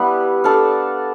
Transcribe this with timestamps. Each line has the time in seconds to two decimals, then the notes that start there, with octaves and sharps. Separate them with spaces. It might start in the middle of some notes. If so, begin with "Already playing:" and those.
Already playing: G3 B3 D4 E4 G4 B4
0.44 D4 A4 D5 F5